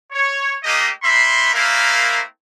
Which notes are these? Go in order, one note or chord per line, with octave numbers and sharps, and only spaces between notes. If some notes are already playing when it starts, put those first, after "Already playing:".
C#5
A3 A#3 G4 D#5
A#3 D#4 E5 B5 C6
A3 A#3 C4 E4 A#4 F5